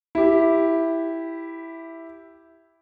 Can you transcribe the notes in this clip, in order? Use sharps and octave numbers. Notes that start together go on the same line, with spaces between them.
E4 G4